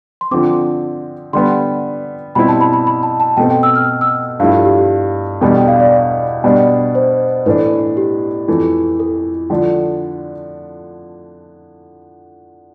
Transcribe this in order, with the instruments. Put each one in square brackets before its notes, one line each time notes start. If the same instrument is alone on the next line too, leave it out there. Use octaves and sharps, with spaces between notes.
[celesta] C6
[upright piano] D3 F3 C4 [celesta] D6
[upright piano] D3 G3 B3 [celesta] C6
[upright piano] B2 G3 C4 E4 [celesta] B5
[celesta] A5
B5
B5
B5
A5
A5
[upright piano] B2 A3 C4 [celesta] G5
[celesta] G5
E6
F6
E6
[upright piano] G2 F3 A3 E4 [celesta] F5
[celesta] G4
G4
G4
[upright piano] E2 B2 G3 D4 [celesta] A4
[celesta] G5
F5
D5
[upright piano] B2 G3 B3 D4
[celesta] C5
[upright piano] A2 E3 A3 D4 [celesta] B4
[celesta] G4
[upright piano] F2 E3 A3
[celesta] A4
[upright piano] D3 F3 A3 D4